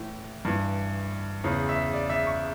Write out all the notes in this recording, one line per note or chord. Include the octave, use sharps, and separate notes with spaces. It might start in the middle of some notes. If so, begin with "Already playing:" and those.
Already playing: A2 E3
G2 E3
E2 C#3 E3
E5
D5
E5
C#6